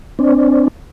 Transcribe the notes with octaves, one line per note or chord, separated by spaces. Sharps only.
C4 D4